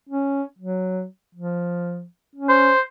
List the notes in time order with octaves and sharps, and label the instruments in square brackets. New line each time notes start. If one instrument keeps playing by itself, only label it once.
[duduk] C#4
F#3
F3
C#4
[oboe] C5